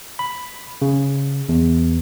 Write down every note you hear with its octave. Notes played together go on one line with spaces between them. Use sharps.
B5
C#3
E2